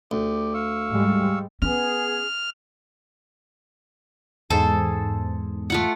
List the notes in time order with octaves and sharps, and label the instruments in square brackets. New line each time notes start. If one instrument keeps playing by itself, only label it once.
[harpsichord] D2 [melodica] G4 D5
[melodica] F5 C#6 E6
[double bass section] G#2 G3 G#3
[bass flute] B3 [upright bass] C#4 [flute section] G#4 [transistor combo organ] F6
[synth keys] E2 G#2 [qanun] G#4 A4 C5
[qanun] A3 F4 F#5